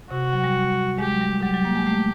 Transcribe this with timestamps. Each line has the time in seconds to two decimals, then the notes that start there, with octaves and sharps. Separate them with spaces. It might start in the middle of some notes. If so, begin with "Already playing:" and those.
0.10 C3 F#4
0.33 F#3
0.44 G3
0.98 G#3 G4
1.11 F#3
1.21 G3
1.42 F#3 G4
1.54 F#3
1.65 A#3
1.76 G#3
1.87 A3